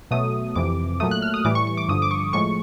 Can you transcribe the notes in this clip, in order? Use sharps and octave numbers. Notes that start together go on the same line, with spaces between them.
B2 F#3 A3 D#6
F2 C3 E3 D6
A#2 F#3 A3 D#6
F#6
F6
D#6
A2 E3 G3 D6
C#6
C#6
D6
G2 D3 F3 D#6
D6
C#6
A2 F3 G#3 C#6